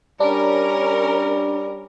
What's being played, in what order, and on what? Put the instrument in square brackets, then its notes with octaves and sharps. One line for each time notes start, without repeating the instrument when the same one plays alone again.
[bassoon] G3 [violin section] C#4 A#4 [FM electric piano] D4